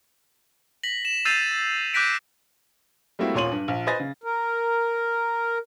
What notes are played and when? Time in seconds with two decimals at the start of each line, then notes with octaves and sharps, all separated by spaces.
0.83 A#6 B6 F#7
1.05 E7
1.25 E6 G6 A6 C7 D#7 F7
1.51 A6
1.94 D6 F#6 G6 A#6 B6 D7
3.19 G3 A3 A#3 C4 E4 F#4
3.34 D#1 A#2 C#5 C6 D#7 F#7
3.52 G2
3.68 A#1
3.87 B4 C5 D#5 G#5 A6 A#6
4.00 C#3
4.24 A#4